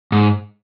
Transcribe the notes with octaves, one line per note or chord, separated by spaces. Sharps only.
G#2